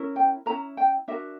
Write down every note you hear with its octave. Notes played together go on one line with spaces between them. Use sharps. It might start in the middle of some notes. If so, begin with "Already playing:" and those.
Already playing: C#4 E4 A#4
G5
C#4 E4 A#4 A#5
G5
D4 F#4 A#4 E5